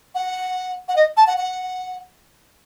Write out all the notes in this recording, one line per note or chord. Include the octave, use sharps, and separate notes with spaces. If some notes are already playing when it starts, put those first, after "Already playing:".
F#5
F#5
D#5
A5
F#5
F#5